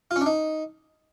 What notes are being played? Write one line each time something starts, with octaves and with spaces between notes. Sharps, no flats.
F4
C#4
D4
D#4